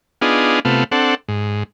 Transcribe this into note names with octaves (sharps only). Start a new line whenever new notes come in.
B3 D4 D#4 F4 G#4
C3 A3 B3 F4
C4 D4 A4 F#5
G#2